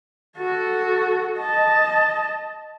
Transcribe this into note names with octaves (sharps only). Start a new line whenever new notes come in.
F#4 A4
D#5 A5